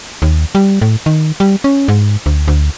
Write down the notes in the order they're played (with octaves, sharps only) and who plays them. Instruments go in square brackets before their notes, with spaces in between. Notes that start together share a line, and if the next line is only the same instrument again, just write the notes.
[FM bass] D#2
G3
A2
D#3
G3
C#4
G#2
D2
D2